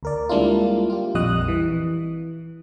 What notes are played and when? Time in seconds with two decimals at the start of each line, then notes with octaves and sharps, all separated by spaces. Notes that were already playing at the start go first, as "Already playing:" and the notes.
0.03 D2 A#4 D5
0.29 G3 G#3 A#3 D4 E4 F4
0.90 F4 G4
1.15 A#1 F2 G3 D#5 D#6 F#6
1.48 E3